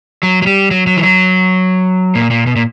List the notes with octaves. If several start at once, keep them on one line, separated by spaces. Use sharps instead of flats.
F#3
F#3
G3
F#3
F#3
E3
F#3
A#2
A#2
B2
A#2